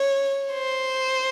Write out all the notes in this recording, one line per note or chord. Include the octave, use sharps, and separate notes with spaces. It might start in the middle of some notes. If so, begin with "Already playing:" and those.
Already playing: C#5
C5